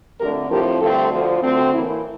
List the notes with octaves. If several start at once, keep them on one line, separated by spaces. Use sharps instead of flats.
F2 D3 A3 D4 G4 A#4
A2 F3 C4 G4 A#4
G2 D3 A3 C4 F4 A4
D2 D3 F3
D2 D3 A3 C4
A2 E3 A#3 E4